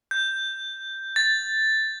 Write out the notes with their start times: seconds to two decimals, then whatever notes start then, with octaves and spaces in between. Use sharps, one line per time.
0.11 G6
1.16 A6